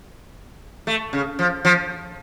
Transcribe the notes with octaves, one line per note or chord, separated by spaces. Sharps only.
A3
C#3
F3
F3